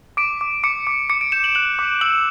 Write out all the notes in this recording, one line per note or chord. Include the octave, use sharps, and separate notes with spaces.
D6 D7
D6
D6 C#7
D6
D6 C#7
D7
G6 E7
F#7
F#6 F#7
D6
E6 F#7